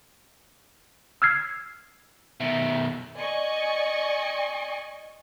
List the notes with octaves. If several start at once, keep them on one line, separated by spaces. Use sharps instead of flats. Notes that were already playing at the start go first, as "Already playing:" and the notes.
E6 F6 G#6 C7
B2 D#3 E5
D5 D#5 G#5 C#6